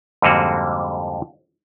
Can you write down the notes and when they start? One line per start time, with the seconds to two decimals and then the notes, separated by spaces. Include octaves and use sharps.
0.22 F2 G#2 D3 G3 A#3 F#4